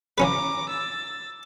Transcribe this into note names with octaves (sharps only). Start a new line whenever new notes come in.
E3 C#4 B4 A#5 D6
E6 A6